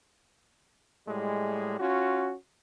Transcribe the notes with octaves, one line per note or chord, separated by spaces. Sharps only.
A2 G3 G#3
C#4 F4 F#4